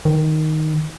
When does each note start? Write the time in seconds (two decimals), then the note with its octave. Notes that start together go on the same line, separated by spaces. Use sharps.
0.05 D#3